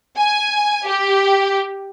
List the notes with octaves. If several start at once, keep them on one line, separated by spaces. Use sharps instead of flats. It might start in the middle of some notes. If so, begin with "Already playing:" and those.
G#5
G4